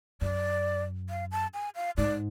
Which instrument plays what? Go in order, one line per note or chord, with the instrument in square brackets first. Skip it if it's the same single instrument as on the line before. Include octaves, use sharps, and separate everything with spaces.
[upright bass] F#2 [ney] D5
[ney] F5
A5
G#5
F5
[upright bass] G#2 [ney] D5